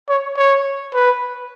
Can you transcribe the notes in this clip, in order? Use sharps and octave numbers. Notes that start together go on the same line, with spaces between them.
C#5
C#5
B4